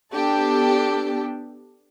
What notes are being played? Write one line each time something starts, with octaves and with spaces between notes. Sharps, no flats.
B3 D4 G4 A4